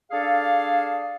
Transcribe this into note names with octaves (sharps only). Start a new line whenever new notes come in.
D4 G#4 A4 F5